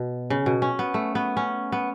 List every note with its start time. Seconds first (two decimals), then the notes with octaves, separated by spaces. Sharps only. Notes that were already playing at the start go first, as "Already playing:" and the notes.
Already playing: B2
0.30 C#3
0.46 B2
0.62 C#4
0.79 B3
0.94 A3
1.15 B3
1.37 C#4
1.72 B3